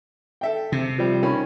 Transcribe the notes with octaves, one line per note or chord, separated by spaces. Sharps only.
A4 E5 G5
C3
F3 G3
D#3 C#4 B5